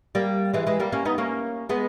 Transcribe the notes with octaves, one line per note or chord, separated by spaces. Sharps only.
G3 A#3
E3 G#3
E3 G#3
G3 A#3
A#3 C#4
B3 D#4
A#3 C#4
G#3 B3